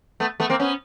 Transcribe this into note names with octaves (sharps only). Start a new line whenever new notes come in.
A3 B3
A3 B3
A#3 C4
B3 C#4